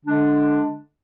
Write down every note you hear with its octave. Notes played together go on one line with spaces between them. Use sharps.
D3 G#3 D4